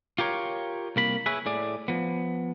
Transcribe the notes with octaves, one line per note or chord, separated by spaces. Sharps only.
F4 G4 A#4 C#5
C2 A#3 B5
E4 G#4 B4 C#5 E5
A2 G#4 D5
F3 B3